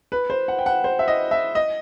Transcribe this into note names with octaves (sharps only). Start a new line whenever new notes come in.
B4
C5
F#5
G5
F#5
C5
E5
D#5
E5
D#5